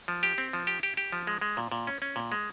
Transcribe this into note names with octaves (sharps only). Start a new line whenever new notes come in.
F3
G4
C4
F3
G4
G4
G4
F3
G#3
G#3
A#2
A#2
C#4
C#4
A#2
G#3